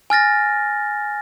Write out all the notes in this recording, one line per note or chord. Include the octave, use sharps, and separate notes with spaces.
G#5 F6 A6 A#6